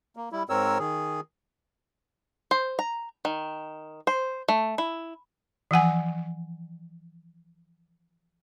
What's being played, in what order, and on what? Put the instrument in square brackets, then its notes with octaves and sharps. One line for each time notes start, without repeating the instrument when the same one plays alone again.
[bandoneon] A#3
G3 E4
G#2 C4 A#4 C#5 E6
D#3 G#4
[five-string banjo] C5
A#5
D#3
C5
A3
E4
[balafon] E3 F3 F#5 G#5